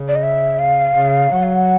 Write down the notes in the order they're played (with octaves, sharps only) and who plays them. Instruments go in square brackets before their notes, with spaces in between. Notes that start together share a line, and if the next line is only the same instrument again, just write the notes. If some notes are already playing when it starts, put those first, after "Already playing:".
Already playing: [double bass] C#3
[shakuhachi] D5
D#5
E5
F5
[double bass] C#3
[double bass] F#3 [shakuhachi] F#5
[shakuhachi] F5
F#5